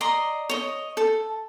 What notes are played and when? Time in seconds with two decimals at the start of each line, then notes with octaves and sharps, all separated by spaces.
0.01 D5 D#5 A#5 C6
0.50 C#5 D#5
0.97 A4